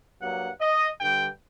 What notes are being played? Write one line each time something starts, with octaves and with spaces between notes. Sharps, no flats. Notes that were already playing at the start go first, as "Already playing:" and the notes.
G2 F#3 A#3 F#5
D#5
G2 D3 G3 G5